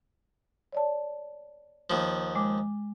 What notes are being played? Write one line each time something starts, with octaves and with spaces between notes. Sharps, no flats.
C#5 D5 A5
D#2 F3
G#3 D6